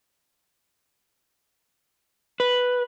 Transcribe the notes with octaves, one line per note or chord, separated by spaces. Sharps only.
B4